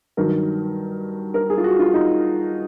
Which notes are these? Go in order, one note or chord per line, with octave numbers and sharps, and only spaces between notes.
G2 D#3 F#3 A#4
A#4
G#4
F4
F#4
F4
D#4